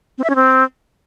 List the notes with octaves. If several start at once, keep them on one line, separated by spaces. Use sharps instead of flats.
C4
E5
C#4
C4